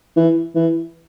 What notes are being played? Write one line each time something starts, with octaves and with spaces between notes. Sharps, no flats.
E3
E3